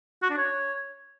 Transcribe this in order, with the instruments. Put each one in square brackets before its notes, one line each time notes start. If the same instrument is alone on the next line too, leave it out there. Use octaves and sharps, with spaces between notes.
[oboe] F#4
D4
C#5